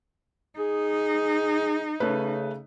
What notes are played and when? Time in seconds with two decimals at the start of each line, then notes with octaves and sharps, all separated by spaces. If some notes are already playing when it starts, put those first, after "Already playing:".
0.59 D#4 G#4
2.00 C#3 A3 C#4 B4